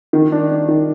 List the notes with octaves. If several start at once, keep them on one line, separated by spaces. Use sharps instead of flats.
D#3
D4
D4
D#3